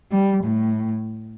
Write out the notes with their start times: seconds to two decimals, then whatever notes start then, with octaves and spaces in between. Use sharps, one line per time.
0.11 G3
0.44 A2